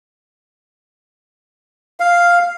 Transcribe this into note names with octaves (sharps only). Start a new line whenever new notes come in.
F5